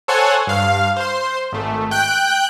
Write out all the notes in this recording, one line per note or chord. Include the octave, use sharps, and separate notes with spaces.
A4 C5 C#5 F#5 G#5
G2 F5
C5 C6
G#1 A3
G5 F#6 G6 D7